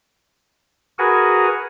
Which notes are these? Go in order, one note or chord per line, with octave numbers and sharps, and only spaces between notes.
F#4 G#4 A#4 B4 F#5 G#5